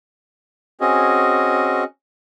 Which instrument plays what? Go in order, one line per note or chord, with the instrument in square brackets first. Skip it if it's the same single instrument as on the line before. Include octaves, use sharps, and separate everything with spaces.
[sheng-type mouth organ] C4 C#4 F#4 G#4 D#5